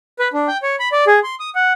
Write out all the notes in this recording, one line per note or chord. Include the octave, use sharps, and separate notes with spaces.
B4
D4
G5
C#5
B5
D5
G#4
C6
D#6
F#5